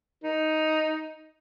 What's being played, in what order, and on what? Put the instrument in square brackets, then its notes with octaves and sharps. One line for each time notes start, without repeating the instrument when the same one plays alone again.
[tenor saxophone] D#4